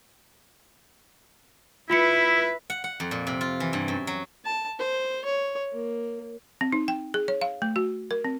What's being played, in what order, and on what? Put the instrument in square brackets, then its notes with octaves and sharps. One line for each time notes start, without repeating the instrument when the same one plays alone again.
[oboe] E4 [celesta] F4 B5 C#7 [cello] B4 E5
[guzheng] F#5
F#5
F2
A#2
C3
F4
E3
G2
F#2
F#3
[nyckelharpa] A5
C5
C#5
A#3
[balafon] C4
D#4
G5
G#4
C#5
F5
A3
F#4
A#4
C4